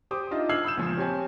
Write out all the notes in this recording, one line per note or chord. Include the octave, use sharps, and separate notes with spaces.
G4 C5 D6 D#6
D4 D#4 F4 D#5 E5
E6 F6 G#6 C7 F#7
B5 D#6 E6 G6 E7
C#2 A#2 F3
C4 G4 C#5 G#5 A5